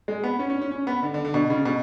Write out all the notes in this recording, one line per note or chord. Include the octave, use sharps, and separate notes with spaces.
G#3
B3
C#4
C#4
C#4
C#4
B3
D3
D3
D3
B2
C#3
B2